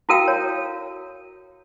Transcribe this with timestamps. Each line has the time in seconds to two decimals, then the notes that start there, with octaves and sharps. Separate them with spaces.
0.09 E4 F#4 A4 A#4 F5 G5
0.28 C#5